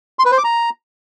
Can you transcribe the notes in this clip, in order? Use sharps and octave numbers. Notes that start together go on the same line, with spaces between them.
C6
B4
C5
D6
A#5